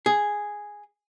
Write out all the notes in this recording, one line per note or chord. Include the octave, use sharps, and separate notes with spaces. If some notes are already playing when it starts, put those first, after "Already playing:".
G#4